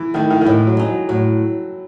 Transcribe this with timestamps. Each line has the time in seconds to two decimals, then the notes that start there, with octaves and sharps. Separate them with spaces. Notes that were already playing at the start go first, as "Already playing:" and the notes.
Already playing: E3
0.14 D#3 A3 E4
0.30 D#3
0.41 D#3
0.45 A2 E3
0.67 F#3
0.77 G#3 D#4
0.88 F#3
1.09 A2 F#3